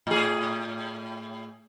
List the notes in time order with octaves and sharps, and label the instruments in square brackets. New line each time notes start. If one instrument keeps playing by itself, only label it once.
[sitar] A2 G#4